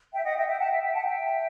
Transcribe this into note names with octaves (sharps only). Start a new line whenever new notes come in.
E5 G5
D#5 F#5
E5 G5
E5 G5
F#5 A5
E5 G5
E5 G5
F#5 A5
E5 G5